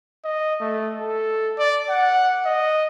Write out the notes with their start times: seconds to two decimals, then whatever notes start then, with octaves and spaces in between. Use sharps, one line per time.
0.24 D#5
0.61 A3
1.01 A4
1.58 D5
1.89 F#5
2.45 D#5